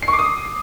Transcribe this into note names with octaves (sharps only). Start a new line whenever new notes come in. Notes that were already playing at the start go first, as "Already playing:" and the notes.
C7
C#6
D6
D#6